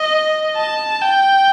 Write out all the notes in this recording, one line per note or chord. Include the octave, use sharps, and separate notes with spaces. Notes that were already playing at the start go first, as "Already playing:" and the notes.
Already playing: D#5
A5
G5